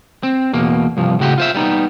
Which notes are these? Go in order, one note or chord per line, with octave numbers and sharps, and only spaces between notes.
C4
E2 B2 A#3
C2 G2 F3
A2 C#3 F#4 G4
F4 C5 E5
G3 B3 D#4